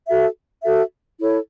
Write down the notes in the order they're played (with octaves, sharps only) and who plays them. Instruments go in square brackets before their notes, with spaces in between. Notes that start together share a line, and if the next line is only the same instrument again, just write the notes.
[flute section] F#4 A4 E5
F#4 A4 E5
E4 A4 C#5